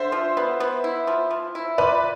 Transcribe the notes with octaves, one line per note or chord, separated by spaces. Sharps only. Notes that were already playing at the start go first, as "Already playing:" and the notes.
Already playing: D3 C5 E5
F3
B3
B3
E4
F3
F3
E4
F3 B4 D5